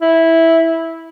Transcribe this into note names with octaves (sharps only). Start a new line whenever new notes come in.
E4